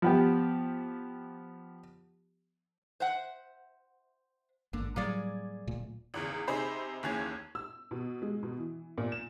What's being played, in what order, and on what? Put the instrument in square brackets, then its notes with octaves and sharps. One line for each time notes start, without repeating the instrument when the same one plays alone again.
[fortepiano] F3 B3 G4
[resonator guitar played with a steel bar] C5 E5 F#5
[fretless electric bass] G#1 G2 A#3 [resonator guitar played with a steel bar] D3
[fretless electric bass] A2 F#3 G3 [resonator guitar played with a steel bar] A#3 G#4 D5
[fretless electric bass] D1 A#2 A3
[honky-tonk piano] G#1 E2 C#3
C3 D#4 G#4 C5 B5 C7
F#1 D#2 E3 C#4 G#4 G#6
E6
B2
G#3
B2
E3
A#2
E7